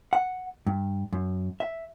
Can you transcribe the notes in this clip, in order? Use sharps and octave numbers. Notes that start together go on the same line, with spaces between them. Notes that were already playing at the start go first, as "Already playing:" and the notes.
F#5
G2
F#2
E5